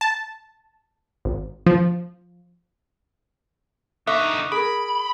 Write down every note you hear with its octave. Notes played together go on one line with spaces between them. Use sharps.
A5
G#1
F3
D3 D#4 D#5 E5 C#6 D6 F#6
G#4 A#4 B5 D#6 D7